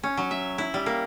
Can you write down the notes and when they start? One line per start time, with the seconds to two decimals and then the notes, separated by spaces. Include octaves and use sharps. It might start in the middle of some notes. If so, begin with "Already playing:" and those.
0.03 C#4
0.17 F#3
0.31 E5
0.58 E4
0.74 G3
0.86 A#3